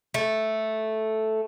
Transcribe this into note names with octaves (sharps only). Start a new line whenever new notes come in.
A3